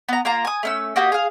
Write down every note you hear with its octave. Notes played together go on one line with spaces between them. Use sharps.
B3 A#5
A#3 F4 F5 A#5
G#5 D#6
A3 C#4 E6
A#3 F#4 G4 D#5
G#4 F5